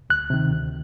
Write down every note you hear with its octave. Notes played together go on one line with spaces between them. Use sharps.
D2 F#6
C3 D#3
D2